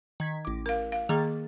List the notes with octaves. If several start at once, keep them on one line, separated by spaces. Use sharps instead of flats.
D#3 G#6 B6
A1 D6
A#4 F5
F5
D#3 A#3 G#4 A6